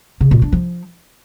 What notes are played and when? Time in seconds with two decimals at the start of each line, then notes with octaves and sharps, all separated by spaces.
0.21 C#3
0.31 A#2
0.42 D4
0.52 F3